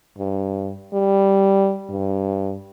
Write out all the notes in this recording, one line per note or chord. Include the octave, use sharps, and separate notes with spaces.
G2
G3
G2